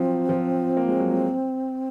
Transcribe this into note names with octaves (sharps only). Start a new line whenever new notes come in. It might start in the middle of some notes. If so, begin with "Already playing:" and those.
Already playing: F3 F#3 C4
F3
A#3
G#3
F#3
G#3